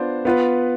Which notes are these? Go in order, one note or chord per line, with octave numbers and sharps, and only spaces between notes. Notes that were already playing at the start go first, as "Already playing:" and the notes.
Already playing: B3 D4 F4 C5
B3 F4 B4